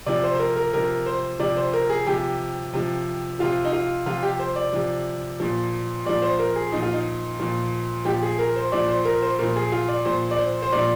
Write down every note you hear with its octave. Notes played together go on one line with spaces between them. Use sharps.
C3 F3 D5
C5
C5
A#4
A#4
C3 F3 A#4
C5
C3 F3 D5
C5
A#4
G#4
C3 F3 G4
C3 F3
C3 F3 F4
D#4
F4
C3 F3 F4
G4
C5
D5
C3 F3
A#2 F3
A#2 F3 D5
C5
A#4
G#4
A#2 F3 D#4
F4
D#4
A#2 F3
A#2 F3 G4
G#4
A#4
C5
A#2 F3 D5
C5
A#4
C5
A#2 F3 A#4
G#4
F4
D5
A#2 F3 C5
D5
C5
C5
A#2 F3 D5